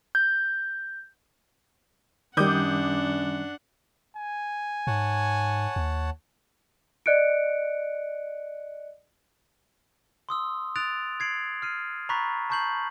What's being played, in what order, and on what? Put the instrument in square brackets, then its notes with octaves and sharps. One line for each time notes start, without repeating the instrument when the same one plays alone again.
[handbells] G6
[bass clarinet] F#2 [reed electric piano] D#3 G3 [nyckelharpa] D4 F#5 [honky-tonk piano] D6 D#6 G6
[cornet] G#5
[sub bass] G#2 [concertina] C#5 F#5 A5
[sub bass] D#2
[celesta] D5 D#5 F#6 C#7 D7
[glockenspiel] C6 D#6 E6
D#6 F#6 A6 D7 F7
G#6 C7 D7 F#7
F6 C7 D#7
A#5 B5 C#6 F#6 A6 B6
A5 A#5 C#6 G6 C7 F#7